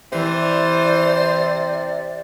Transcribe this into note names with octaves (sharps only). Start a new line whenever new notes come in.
C3 E3 C5 D5